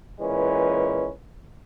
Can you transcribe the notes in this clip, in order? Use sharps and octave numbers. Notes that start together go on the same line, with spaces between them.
A#2 E3 G#3 C#4 B4